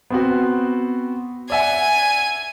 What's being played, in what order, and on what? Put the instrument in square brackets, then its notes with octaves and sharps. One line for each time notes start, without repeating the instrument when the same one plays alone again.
[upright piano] B3 C4 F#4
[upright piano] D5 E5 F#5 [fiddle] G#5